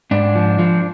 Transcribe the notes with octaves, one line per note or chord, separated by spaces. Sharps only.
G#2 D4
F3
F3